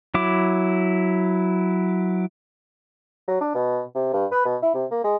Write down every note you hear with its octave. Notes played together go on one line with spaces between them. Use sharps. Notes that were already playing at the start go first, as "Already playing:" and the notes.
F#3 E4 D6
F#3
D4
B2
C3
G2
B4
B2
E4
C3
A#3
G#3